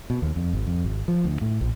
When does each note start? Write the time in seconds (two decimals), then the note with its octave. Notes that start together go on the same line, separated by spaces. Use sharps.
0.10 B2
0.22 D#2
0.36 F2
0.53 G#1
0.67 F2
0.84 G#1
1.08 F3
1.24 D2
1.41 A2
1.61 A#1